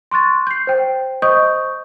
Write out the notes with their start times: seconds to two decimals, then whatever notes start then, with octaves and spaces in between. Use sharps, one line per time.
0.12 C6 C#6 F#6 A6
0.47 G6 C7
0.67 C5 G5
1.22 C5 D#5 C#6 D#6 G6